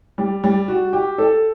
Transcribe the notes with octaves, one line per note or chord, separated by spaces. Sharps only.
G3
G3
F#4
G4
A4